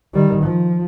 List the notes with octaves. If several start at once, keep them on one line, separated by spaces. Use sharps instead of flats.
D#3 G3
F3